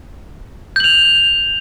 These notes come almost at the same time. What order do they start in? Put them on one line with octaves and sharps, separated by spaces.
G6 F#7 F7